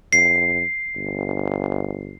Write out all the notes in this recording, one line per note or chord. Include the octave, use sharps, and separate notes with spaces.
F2 C7
G1